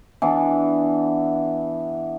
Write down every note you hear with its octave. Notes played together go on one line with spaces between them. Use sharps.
E3 B3 D4